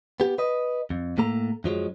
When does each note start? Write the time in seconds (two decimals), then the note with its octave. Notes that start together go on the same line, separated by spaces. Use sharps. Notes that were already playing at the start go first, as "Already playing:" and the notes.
0.20 B3 G4
0.38 B4 D#5
0.90 F2
1.18 A2 A#3 A4 A#5
1.64 F#2 F3 F#3 G#3